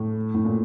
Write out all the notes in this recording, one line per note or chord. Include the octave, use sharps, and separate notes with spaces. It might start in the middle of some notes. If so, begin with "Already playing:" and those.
Already playing: A2
A2
A#2